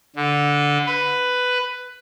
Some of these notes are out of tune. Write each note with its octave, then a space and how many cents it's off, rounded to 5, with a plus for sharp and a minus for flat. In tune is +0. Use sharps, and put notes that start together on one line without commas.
D3 -10
B4 +10